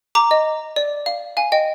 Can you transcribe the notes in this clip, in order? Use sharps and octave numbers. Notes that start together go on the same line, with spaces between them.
A#5 D6
D#5
D5
F5
F5 G#5
D#5 G5